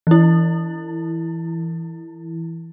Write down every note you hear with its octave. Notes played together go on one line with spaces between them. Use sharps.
E3 E4